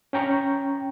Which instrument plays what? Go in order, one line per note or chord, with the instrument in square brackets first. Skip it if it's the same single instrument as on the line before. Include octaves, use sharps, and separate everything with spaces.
[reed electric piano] C#4 G5 A#5 C#6